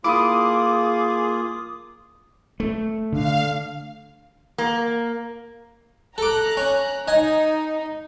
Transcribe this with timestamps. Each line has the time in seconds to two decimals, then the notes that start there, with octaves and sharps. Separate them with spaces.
0.04 A#3 E4 F4 G#4 D6 D#6
2.60 A3
3.12 D3 F5
4.58 A#3
6.18 A4 A#5 D6 F#6
6.57 C#4
7.08 D#4 D#5 G#5